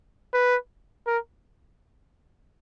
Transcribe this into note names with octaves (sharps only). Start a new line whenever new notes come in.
B4
A#4